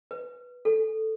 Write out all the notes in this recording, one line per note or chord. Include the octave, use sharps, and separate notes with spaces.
B4
A4